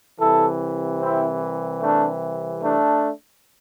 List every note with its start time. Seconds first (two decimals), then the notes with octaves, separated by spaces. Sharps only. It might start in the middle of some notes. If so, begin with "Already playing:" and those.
0.20 C2 C3 E3 E4 A4
1.00 C4 E4
1.81 A3 D4
2.61 A3 D4